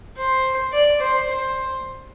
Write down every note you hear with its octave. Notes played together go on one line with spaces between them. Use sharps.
C5
D5
C5
C5